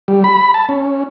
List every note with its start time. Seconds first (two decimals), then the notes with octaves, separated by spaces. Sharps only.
0.08 G3
0.24 B5
0.54 A5
0.69 C#4